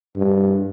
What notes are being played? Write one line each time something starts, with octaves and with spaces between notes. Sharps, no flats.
G2